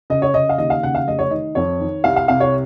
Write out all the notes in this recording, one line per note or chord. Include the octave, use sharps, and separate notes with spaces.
C#3 D#5
C#5
C#3 D#5
F5
D#2 D#5
F5
C#3 F#5
F5
F1 D#5
C#5
D#3 D#5
F2 C#5
D#3
C2 F5
F5
C3 F5
C#5